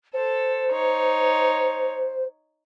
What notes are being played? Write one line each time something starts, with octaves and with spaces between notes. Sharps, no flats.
A4 C5
D#4 C#5